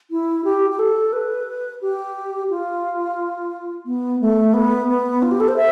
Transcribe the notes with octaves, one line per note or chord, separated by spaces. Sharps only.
E4
G4
G4
A4
B4
G4
F4
B3
A3
B3
B3
F4
G4
A4
C5
E5